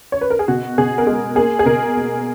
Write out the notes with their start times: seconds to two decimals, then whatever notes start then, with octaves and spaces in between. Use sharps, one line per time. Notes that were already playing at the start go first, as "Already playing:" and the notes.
0.12 C#5
0.21 B4
0.30 A#4
0.39 G#4
0.48 B2 F#4
0.78 B2 G#4
0.98 A#4
1.07 G#3 G#4
1.36 A#3 G#4
1.59 G#4
1.66 B2 A#4
1.95 A#3